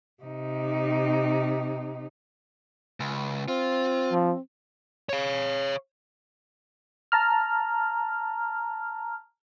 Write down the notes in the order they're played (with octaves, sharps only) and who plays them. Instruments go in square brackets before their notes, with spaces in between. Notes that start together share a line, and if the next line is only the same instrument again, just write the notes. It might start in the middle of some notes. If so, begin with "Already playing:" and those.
[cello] C3 D#4
[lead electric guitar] C#2
[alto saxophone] C4 [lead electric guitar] F4
[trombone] F3
[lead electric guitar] C#5 F5
[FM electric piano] A5 A#5 F6